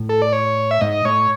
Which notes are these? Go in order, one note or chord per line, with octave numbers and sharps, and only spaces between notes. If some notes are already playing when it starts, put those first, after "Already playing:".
Already playing: A2
A4
D5
C#5
E5
G#2 D#5
A2 C#5